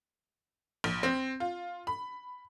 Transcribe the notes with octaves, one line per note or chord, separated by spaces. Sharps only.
A#1
C4
F4
B5